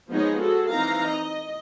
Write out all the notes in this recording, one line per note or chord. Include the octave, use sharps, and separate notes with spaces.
F3 G#3 B3 D#4 G#4 C#5
F#4 G#4 A4
E3 C4 D#4 F5 A#5
D#5